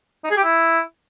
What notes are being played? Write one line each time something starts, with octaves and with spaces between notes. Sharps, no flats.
D#4
G#4
G4
E4